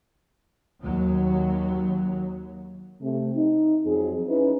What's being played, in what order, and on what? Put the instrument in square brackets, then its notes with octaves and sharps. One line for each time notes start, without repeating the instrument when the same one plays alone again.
[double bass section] D#2 F#3
[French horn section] C3 A3 C4
D#4
F2 F#3 C4 G#4
C#4 D#4 E4 B4